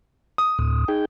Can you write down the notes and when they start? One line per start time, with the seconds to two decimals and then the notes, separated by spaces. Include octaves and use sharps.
0.38 D#6
0.59 D2 A2
0.88 D#4 G#4 G5